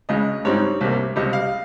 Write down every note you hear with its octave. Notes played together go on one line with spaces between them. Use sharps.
C#2 C#3 G#3 C#4 D#5
G#2 G3 C4 D#4 C#5
C2 C3 G3 A#3
C#2 C3 G3 D#5
F5